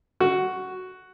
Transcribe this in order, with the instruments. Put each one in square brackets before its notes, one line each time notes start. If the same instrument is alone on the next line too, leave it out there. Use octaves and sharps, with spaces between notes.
[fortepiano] F#4